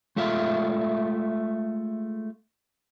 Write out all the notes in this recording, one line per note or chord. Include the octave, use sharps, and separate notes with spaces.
G#3 A3 F4 E5 F5